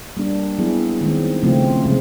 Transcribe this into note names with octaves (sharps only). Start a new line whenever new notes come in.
G3 A#3 D4
F#3 B3 E4 G#4
D#3 G#3 C4
C#3 F3 A3 C4 F4
C3 F3 G#3 C4